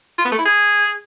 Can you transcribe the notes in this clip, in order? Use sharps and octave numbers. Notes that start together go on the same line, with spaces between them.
F4
B3
A3
E4
G#4